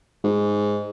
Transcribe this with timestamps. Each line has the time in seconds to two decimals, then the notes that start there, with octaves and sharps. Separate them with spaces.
0.24 G#2